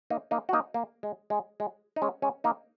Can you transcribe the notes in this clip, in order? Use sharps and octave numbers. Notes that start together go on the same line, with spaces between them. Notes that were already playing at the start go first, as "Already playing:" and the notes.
A#3 D#4
A#3 D#4
F#4
A#3 D#4
A#3
G#3
G#3
G#3
D#4
G#3 C#4
G#3 C#4
A#3 D#4